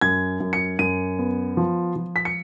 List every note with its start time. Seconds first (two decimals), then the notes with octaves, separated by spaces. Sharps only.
0.01 F#2 G#6
0.40 F#2
0.53 C#7
0.79 F#2 D#7
1.19 B3
1.57 F3
1.96 F3
2.16 B6
2.25 C#7